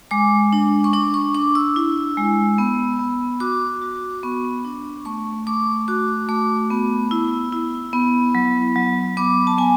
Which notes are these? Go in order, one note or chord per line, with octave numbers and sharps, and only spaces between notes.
G#3 D6
D4
C#6
D4 D6
C#6
D4 D6
E6
E4
G#3
B3
B3
F#4 D6
F#4
B3 C#6
D4
A3 C#6
A3 D6
F#4 D6
A3 D6
B3
E4
E4
B3
F#3
F#3
B3 D6
A5
B3 G#5